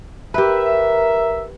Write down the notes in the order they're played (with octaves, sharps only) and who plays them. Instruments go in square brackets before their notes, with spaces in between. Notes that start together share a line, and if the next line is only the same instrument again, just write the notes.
[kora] G4 B4 [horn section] A#4 E5